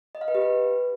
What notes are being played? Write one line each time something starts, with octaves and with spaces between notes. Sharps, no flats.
D#5
F5
B4
G4
B4